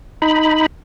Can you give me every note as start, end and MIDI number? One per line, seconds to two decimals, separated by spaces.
0.22 0.66 63
0.22 0.66 83